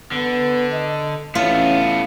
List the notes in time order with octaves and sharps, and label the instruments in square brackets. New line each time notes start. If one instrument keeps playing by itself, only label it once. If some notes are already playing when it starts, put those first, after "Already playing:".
[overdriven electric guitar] D3 [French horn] B3
[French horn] D#5
[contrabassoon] A1 [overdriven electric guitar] A3 B3 [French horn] C#4 [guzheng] F4